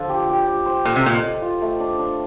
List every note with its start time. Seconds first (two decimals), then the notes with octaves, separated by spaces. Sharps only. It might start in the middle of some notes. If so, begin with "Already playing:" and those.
Already playing: D3 F3 F4
0.09 G4
0.29 G4
0.47 G3
0.66 C5
0.85 A#2 A4
0.96 C3
1.05 A#2 D#5
1.24 D#5
1.42 F4
1.62 A3
1.80 D4
1.99 D4